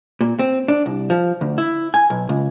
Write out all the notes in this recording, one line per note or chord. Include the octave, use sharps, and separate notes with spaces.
A#2
C4
D4
C2
F3
D2
E4
G#5
B1
C#2